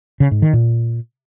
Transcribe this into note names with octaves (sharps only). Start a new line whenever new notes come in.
C#3
G#2
D#3
A#2